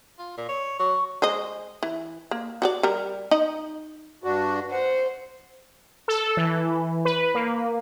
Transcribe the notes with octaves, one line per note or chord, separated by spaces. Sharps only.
F4
A#2
C#5
F#3 C#6
G#3 C5 D#5
E3
A#3
F#4 G4 D5
G3 A#4
D#4 D#5
G2 D4 F#4
C5 F#5
A4
E3
B4
A#3